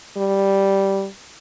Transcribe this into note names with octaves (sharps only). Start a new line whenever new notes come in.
G3